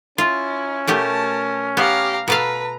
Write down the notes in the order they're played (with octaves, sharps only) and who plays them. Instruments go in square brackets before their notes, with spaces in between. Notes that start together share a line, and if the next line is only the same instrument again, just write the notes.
[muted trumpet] C#4 [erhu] E4 [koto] F4
[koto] B2 A3 G4 [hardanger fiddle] A#4 [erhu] A5
[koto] B3 [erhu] G4 [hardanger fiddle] F5 A#5
[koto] B2 A4 F5 [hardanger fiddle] B4 [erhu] A#5